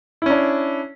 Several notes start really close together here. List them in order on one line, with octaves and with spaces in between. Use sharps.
E4 C#4 D4